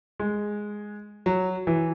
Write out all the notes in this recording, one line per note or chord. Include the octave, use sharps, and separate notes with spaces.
G#3
F#3
E3